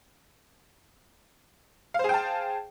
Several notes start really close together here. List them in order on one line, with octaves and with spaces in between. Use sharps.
F5 C5 G#4 G5 A5